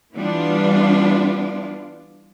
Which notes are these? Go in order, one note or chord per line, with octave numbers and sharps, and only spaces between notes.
E3 G3 B3 D4 F4